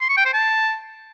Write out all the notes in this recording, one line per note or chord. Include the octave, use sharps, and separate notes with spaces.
C6
C#6
G5
C5
A5